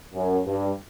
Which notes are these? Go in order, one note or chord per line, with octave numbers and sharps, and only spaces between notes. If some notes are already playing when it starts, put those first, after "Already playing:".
F#2
G2